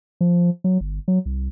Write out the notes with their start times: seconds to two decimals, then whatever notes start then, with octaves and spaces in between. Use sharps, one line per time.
0.21 F3
0.64 F#3
0.81 G1
1.08 F#3
1.26 C2